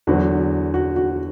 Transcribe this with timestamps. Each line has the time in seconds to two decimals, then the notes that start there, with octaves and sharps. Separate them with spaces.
0.07 E2 D3 F#3 F#4
0.74 F#4
0.96 F#4